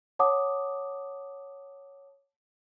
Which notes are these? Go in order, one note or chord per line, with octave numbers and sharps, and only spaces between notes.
C#5 F#5 A5 D6 D#6